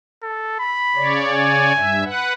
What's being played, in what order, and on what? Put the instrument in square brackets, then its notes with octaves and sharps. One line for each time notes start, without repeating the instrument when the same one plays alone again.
[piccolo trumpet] A4
B5
[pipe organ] C#3 C#5 D5
[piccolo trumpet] G#5
[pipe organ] G2 E5
B4 F#5